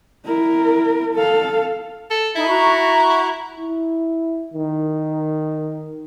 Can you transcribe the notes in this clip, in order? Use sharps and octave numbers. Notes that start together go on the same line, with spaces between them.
E4 A#4
A4 F5
A4
D#4 E4 A4 B5
F#4 A#5 C#6
E4
D#3